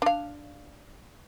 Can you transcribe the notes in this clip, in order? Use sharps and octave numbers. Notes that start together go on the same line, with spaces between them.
D4 F5